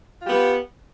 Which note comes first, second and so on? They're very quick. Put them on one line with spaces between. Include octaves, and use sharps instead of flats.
F4 G4 B3